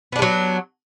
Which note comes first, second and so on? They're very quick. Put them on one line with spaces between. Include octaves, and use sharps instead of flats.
B3 D4 G#3 F#3